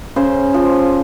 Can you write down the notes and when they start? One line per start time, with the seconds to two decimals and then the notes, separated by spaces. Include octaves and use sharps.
0.16 C#3 C5
0.54 F3